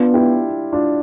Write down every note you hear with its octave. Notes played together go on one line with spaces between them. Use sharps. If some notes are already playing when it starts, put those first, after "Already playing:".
Already playing: B3 D4 F4
E4 G4
D4 F4